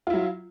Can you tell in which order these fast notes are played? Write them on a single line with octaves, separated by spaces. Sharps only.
F4 E4 F#3